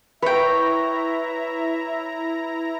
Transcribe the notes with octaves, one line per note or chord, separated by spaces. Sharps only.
E4 B4 C#5 E5 G5 A#5